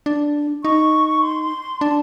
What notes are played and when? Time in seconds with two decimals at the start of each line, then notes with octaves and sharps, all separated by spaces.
0.06 D4
0.64 D#4 C#6
1.23 C6
1.81 D4 A5